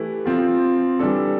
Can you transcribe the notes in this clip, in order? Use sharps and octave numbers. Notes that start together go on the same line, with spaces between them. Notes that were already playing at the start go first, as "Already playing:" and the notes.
Already playing: E3 A3 E4 G4 B4
F3 C4 F4
E3 G3 D4 A4